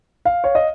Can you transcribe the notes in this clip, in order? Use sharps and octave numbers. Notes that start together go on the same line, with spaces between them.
F5
C#5
D#5